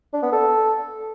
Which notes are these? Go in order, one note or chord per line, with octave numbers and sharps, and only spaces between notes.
D4
B3
A4